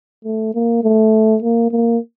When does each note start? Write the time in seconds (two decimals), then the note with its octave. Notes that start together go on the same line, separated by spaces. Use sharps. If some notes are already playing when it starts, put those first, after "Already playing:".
0.25 A3
0.55 A#3
0.84 A3
1.42 A#3
1.71 A#3